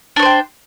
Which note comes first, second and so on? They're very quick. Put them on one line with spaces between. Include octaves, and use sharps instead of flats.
D4 C#5 C5 G5